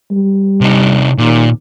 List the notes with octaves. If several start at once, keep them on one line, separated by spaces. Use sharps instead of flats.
G3
C3 D#4
D#2 A#2